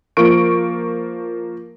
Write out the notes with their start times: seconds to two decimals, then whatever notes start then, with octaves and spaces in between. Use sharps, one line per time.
0.17 F3 A#3 C#6 D7